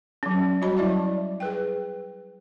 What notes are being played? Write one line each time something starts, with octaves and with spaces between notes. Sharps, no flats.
F#3 C#4
G3 F#4 C#5 D#5 B5
F#3 E4 D5 E5 A5
G#4 B4 G5